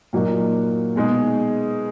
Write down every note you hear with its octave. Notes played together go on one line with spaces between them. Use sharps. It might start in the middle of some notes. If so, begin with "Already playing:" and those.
A#2 F#3 A#3 D#4 F#4
B2 G#3 D#4 G#4